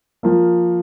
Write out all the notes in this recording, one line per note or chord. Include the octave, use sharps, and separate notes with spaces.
F3 A#3